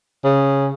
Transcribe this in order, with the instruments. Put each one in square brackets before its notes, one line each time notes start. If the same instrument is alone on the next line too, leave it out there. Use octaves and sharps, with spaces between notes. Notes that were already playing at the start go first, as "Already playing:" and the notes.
[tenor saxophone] C#3